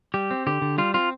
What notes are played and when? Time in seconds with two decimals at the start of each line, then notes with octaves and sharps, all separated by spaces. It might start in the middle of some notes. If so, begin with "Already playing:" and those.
0.14 G3 G4
0.31 C4
0.47 D3 G4
0.62 D3
0.78 G3 F4
0.94 C4 F4